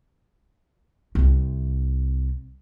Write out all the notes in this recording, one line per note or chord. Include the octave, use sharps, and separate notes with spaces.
C2 C3